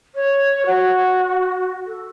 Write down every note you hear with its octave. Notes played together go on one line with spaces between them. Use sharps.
C#5
F#4
A4